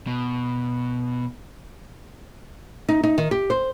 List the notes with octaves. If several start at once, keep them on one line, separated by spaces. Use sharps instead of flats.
B2
D#4
D#4
D#3
G4
C5